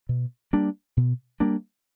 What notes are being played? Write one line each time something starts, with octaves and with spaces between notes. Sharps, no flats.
B2
G3 A#3 D4
B2
G3 A#3 D4